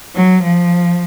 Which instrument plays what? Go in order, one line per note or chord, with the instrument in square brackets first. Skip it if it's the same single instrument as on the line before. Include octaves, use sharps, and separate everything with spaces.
[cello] F#3
F3